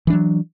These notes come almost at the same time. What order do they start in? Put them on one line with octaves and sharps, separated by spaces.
E3 D4 F#3